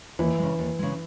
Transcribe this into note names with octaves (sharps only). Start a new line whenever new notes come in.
D#2 E3
C#3 G#3
D#2
C#3 G#3